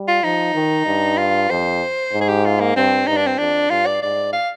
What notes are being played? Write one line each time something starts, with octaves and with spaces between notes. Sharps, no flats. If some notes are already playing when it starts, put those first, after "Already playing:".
Already playing: G3
F4
F3 D#4
D#3
G2
F4
F2 C5
G#2
G#4
G4
F4
A#3
G2 C4
G2 D#4
D4
C4
F2 D4
G2 F4
D5
G#2 D5
F5